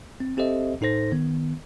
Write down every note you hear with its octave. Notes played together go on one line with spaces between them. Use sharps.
C4
C4 G4 A4 C5 D#5 E5
A2 D#4 A4 C5 A#6
D#3 B3